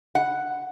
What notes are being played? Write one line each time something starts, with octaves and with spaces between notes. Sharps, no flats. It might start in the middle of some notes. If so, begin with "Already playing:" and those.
F#5